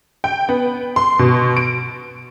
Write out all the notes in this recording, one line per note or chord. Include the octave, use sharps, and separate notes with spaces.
G5
B3
C6
B2
D7